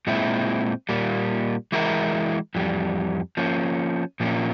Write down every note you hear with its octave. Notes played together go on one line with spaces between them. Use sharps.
A#2 G#3 C4 E4
A#2 G3 A#3
E3 G#3 E4 A#4
F2 E3 G3
F3 A#3 C#4
A#2 F3 A#3 C#4 F4